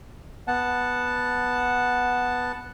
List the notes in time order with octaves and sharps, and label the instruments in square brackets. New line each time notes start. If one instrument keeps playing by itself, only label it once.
[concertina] B3 F#5 A5